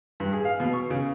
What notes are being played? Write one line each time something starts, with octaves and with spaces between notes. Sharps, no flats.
G2
G#4
F5
B2
C#6
C#3